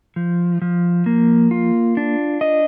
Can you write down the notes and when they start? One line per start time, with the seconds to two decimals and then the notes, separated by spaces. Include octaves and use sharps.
0.16 F3
0.62 F3
1.06 A#3
1.51 F4
1.97 D4
2.41 D#5